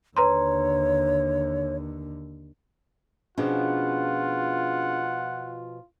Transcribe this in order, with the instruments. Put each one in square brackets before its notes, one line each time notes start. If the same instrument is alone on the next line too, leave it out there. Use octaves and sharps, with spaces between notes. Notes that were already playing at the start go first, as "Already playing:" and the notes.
[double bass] D#2 D3 [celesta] B4 A#5 C6 [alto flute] C#5
[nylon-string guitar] B2 F3 [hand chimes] C#4 D4 G#4 [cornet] F4 [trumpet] F#5